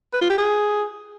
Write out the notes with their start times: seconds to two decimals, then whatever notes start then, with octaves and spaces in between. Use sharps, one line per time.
0.13 B4
0.22 F4
0.30 G4
0.38 G#4